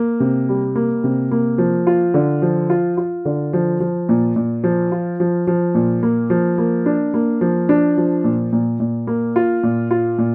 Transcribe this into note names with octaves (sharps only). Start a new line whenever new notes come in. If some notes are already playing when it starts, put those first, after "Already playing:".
Already playing: A#3
C3
G3
A#3
C3
A#3
F3
F4
D3
F3
F4
F4
D3
F3
F3
A#2
A#2
F3
F4
F3
F3
A#2
A#3
F3
A#3
D4
A#3
F3
D4
F3
A#2
A#2
A#2
A#3
F4
A#2
F4
A#2